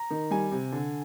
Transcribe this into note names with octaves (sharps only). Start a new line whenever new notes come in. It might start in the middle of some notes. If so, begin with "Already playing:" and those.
Already playing: A#5
D#3
G3 G#5
C3
D3